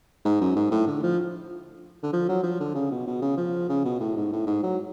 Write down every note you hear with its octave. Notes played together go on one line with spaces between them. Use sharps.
G#2
F#2
G#2
A2
D3
F3
D3
F3
F#3
F3
D3
C#3
B2
B2
C#3
F3
C#3
B2
A2
G#2
A2
G#2
F#3